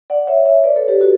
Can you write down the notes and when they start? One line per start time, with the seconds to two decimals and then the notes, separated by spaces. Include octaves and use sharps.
0.10 D5 F#5
0.27 C#5 E5
0.46 C#5 E5
0.64 B4 D5
0.76 A4 C#5
0.88 G4 B4
1.00 F#4 A4